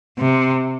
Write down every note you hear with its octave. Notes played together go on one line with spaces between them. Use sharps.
C3